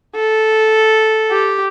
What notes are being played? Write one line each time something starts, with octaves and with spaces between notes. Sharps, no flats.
A4
G4